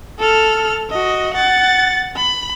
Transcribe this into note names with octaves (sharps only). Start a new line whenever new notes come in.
A4 F6
F#4 D#5
F#5 A6
B5